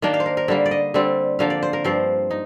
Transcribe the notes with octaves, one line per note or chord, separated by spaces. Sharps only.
D#3 A#3 D4 G5
F5
C5
A#4
A#4
D3 G3 A#3
D5
D#5
D3 G3 C4
D3 F3 A#3 F5
D5
C5
A#4
G2 F3 C4 C5
D#4